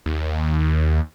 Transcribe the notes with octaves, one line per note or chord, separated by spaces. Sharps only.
D#2